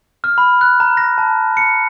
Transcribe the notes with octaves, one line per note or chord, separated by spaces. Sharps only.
F6
B5
F#6
A#5
A#6
A5
C#7